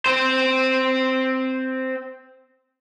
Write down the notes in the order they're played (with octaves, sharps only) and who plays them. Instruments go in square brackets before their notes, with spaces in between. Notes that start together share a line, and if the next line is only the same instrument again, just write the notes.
[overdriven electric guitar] C4 C5